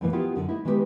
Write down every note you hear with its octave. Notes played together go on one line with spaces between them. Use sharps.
F2 G#2 B2 E3 F3 A#3
B3 E4 F4 G4 G#4 A#4
F#2 D3 G#4 A4
A#3 D#4 E4
D#3 G#3 B3 F#4 G4 B4